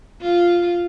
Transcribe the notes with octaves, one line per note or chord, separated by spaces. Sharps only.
F4